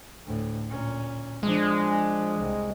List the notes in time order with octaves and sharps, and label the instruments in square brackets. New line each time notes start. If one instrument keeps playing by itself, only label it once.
[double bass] D2 A2
A#2 C#4
[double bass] F3 D4 [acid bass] G#3
[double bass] C2